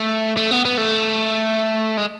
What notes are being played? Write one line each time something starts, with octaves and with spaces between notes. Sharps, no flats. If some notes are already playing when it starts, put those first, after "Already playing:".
Already playing: A3
A3
B3
B3
A3
G#3